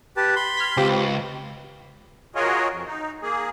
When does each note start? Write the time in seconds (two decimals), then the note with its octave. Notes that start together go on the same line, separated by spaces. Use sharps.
0.17 G4 B4 A5
0.36 B5 C6
0.57 F6 G#6 B6
0.77 C#2 C4 F4 G4
2.35 F4 F#4 G#4 A#4 C#5 D#5
2.71 F2
2.87 D#4
3.22 A#3 G#4